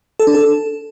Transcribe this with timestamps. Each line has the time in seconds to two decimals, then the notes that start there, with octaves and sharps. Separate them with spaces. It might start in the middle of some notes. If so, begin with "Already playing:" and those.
0.20 A4
0.27 D4
0.35 A4